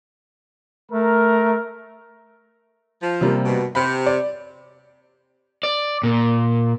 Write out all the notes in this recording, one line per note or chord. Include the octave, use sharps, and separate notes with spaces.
A3 A#4
F3
C3 G3 A#3
G2 B2
C3 B5
D5
D5
A#2